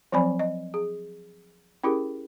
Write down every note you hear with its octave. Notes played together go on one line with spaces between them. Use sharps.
F3 F#3 C4 D5 G#5 B5
D#5
G#4
C#4 E4 G4 G#4 A#4